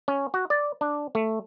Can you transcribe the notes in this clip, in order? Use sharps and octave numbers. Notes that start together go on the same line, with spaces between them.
C#4
F#4
D5
D4
A3